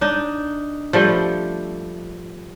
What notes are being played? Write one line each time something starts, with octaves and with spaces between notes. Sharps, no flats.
D4 D#4
F3 G3 A3